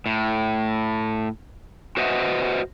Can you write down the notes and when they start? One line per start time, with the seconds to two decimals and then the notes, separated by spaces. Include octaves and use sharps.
0.06 A2
1.97 F#4 B4 C5 D#5 E5 F#5